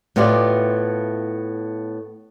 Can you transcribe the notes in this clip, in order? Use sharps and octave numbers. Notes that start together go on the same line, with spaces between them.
A2 B3 E4 F4 G4 D5